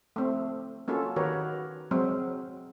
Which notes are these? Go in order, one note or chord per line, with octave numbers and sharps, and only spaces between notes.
A3 C4
A#3 C#4 F4 F#4 A4
D#3 F#4 G4 A#4 B4 C#5
F#3 G#3 C4